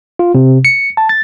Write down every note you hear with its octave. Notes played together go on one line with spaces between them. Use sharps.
F4
C3
C#7
A5
A6